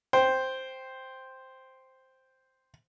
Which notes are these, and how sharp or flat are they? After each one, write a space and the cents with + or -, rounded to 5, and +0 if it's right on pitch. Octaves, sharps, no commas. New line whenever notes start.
C5 +0 G5 +0